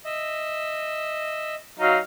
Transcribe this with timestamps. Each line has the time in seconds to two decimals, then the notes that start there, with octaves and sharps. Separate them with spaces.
0.05 D#5 E5
1.79 F#3 D#4 F5